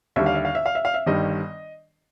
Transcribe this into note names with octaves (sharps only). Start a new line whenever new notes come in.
D#2 D3 G3 E5
F5
E5
F5
E5
F5
E5
F5
E5
G1 G2 D#3 G3 D#5